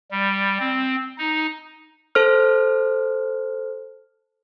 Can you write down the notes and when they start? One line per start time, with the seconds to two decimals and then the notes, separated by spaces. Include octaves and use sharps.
0.11 G3
0.60 C4
1.18 D#4
2.15 A4 C5 F6